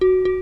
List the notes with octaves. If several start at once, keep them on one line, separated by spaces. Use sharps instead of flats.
F#4
F#4